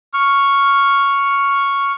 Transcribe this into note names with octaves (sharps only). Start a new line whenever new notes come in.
C#6 F6